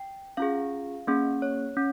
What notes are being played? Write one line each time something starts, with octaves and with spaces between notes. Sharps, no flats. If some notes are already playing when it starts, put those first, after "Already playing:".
Already playing: G5
C#4 F4 G#4 F5
A#3 C#4 G#4
C#5
C#4